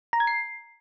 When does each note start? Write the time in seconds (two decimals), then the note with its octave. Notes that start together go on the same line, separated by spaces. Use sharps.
0.13 A#5
0.20 G#6
0.27 C7